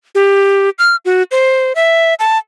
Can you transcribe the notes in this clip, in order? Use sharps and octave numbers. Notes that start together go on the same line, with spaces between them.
G4
F6
F#4
C5
E5
A5